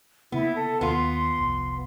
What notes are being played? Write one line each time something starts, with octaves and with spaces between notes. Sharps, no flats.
C#3 A#3 B3 E4
A4
D#2 B3 F4 C6
F1 C2